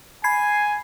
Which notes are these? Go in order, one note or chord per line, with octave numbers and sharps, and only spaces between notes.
G#5 B5 G#6 C7